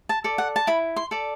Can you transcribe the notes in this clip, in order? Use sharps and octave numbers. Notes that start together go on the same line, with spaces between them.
A5
A4 D5
F#5
A5
E4 B5
C6
A4 D5